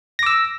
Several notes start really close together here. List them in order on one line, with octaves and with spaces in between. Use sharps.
A#6 D6 E6